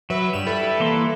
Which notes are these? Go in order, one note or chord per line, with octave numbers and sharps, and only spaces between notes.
F#3 B4 E5
G2 G3 E7
E4 A4 B4
E3 A#3 C6